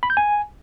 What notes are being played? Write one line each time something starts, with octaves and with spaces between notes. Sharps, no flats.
B5
G6
G#5